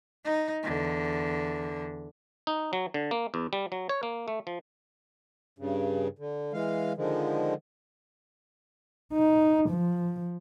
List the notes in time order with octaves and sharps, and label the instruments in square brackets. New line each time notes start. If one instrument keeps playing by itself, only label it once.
[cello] D#4
E2 D3
[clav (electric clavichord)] D#4
F#3
D3
A#3
E2
G3
F#3
C#5
A#3
A3
F3
[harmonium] G2 C#3
D3
E3 G#3 F5
D3 D#3 F3 G#3
[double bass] D#4
F3